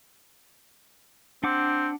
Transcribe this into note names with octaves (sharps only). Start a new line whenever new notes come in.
C4 D4 F#5 D6